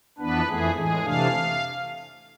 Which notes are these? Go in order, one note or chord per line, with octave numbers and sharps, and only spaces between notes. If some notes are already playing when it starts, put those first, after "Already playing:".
F2 E3 B3 D4 B4
F2 E3 A3 G#4
A2 E3 G#3 G#4
C3 E3 A3 D4 F5